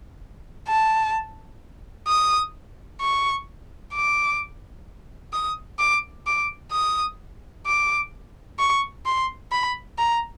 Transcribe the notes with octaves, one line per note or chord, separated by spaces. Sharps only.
A5
D#6
C#6
D6
D#6
D6
D6
D#6
D6
C#6
C6
B5
A#5